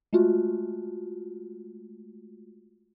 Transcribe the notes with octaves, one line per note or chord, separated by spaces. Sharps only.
G#3 A3 F4 F#4